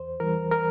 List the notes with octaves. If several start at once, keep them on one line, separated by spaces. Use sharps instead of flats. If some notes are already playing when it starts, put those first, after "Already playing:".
Already playing: E2 C5
E3 G3 A#4
A#4